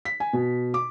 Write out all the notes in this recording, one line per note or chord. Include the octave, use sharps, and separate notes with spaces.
B6
G#5
B2
D6